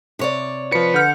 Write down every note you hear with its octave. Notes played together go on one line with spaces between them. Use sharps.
C3 C#5 D5
F3 B4 C#7
D3 F#5 F6 G6